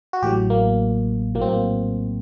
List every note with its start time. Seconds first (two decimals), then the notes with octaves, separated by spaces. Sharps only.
0.13 F#4
0.22 A1 A2 F#3 G4
0.50 A#3
1.35 A#1 A2 F#3 A#3
1.41 C4
1.49 A#3